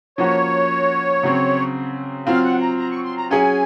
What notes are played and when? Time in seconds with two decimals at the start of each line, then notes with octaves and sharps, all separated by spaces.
0.18 F3 A#3 C#4 F#4 C#5
1.23 C#3 F#3 C4
2.27 F#3 C4 F4 F5
2.44 F#5
2.61 A#5
2.79 A#5
2.91 C#6
3.04 C6
3.17 A#5
3.31 F#3 C#4 G#4 G#5